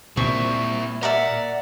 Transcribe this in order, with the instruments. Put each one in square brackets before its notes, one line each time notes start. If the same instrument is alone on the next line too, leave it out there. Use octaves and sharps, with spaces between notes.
[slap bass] A#2 [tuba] A#3 [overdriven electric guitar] C4 E4 [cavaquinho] C#6
[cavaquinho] A#4 D5 E5 [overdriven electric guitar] F#5